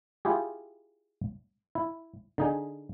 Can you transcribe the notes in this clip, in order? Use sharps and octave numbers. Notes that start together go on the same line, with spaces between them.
E4 F4 G4 G#4
E4
D3 D#4 G#4